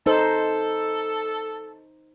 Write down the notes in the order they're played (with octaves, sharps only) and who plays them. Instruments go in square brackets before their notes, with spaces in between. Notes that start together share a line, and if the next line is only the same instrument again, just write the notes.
[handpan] D#4 C5 [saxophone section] A4